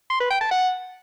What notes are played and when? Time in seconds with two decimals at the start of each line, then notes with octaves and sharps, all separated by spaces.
0.10 C6
0.20 B4
0.30 G5
0.41 A5
0.51 F#5